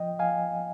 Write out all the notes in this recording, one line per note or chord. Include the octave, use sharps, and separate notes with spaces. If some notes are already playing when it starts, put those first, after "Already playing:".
Already playing: F3 D#5 G5
F3 F5 G#5